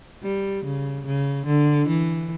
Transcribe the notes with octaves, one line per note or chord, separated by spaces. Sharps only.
G3
C#3
C#3
D3
E3